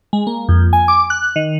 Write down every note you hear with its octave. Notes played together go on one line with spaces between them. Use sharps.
G#3
A#3
F2
G#5
D6
F#6
D#3